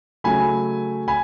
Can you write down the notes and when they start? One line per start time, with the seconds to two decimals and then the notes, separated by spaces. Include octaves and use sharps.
0.24 C#3 F#3 A3 G#5 B5
1.08 G#5 B5